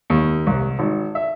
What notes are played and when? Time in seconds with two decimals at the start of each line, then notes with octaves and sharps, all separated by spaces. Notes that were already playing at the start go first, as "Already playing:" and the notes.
0.10 D#2
0.47 C2
0.79 G#1
1.15 E5